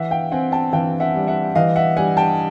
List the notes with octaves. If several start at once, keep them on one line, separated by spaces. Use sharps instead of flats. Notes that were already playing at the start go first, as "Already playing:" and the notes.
Already playing: E3 E5 F#5
F5 G5
C4 F#5 G#5
G5 A5
E3 F5 G5
E5 F#5
G3
E5 F#5
E3 D#5 F5
E5 F#5
G3 F#5 G#5
G5 A5